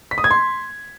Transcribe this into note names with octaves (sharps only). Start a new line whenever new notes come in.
B6
D#6
G#6
C6